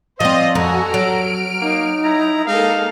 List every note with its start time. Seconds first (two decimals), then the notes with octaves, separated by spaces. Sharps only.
0.20 F3 C4 C5 D5 D#5 F5
0.55 F2 F#4 A4 G#5 A#5
0.94 F#3 F6 D7
1.61 A#3 D#4
2.04 E4 A#5
2.47 G#3 A#3 D#4 A4 F5